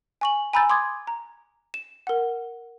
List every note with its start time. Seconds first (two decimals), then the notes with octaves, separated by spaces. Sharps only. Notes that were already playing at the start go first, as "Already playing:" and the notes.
0.21 G#5 C#6 F#7
0.53 G#5 A#5 B5 E6 G6 A6
0.70 C6 D6 D#6 G#6
1.07 A#5
1.74 E7
2.07 A#4 F#5